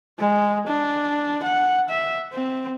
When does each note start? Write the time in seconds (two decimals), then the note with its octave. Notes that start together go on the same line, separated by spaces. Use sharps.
0.19 G#3
0.67 D4
1.43 F#5
1.89 E5
2.33 C4